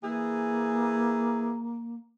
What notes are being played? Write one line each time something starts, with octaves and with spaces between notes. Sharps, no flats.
E3 A#3 G#4